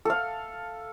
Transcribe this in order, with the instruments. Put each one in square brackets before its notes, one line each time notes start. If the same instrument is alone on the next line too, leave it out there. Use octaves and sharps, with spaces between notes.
[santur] A4 F5